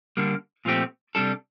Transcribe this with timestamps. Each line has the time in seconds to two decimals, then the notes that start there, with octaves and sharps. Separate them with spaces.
0.17 D3 G3 A#3
0.65 A#2 F3 A3 C4 G4
1.15 C3 G3 D4 A4